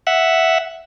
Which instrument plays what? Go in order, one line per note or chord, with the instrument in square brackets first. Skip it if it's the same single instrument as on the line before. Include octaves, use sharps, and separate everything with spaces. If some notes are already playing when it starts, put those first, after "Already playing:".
[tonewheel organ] E5 F#5